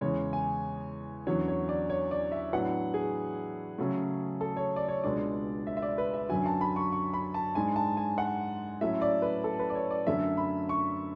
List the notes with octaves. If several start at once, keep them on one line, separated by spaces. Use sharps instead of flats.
E2 C#3 G#3 C#5
G#5
E2 D3 F#3 C#4 C#5
C#5
D5
C#5
D5
E5
A2 F#3 B3 D4 F#5
G#4
C#3 F#3 A3 C#4
A4
C#5
D5
C#5
C#2 B2 G#3 D4 D5
E5
E5
D5
B4
E5
F#2 D3 F#3 G#5
A5
B5
C#6
C#6
B5
A5
G#2 G#3 D4 G#5
A5
G#5
F#5
A2 F#3 A3 C#4 E5
D5
B4
A4
B4
D5
C#5
D5
F#2 D3 A3 C#4 E5
B5
C#6